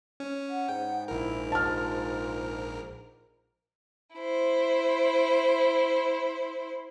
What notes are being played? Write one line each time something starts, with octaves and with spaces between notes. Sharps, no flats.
C#4
F#5
G#2 G5
A#1 E4 A#4
F4 A5 F6
E4 C5